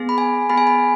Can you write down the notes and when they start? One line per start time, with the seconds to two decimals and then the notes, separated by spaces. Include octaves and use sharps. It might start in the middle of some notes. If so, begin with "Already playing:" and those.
Already playing: B3 G#4
0.09 B5
0.18 G#5
0.50 B3 G#4 B5
0.57 G#5
0.67 B5